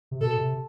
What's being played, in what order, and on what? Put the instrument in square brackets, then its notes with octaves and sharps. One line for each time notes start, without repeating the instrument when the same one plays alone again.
[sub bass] C3
[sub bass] B2 [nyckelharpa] A4
[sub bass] C3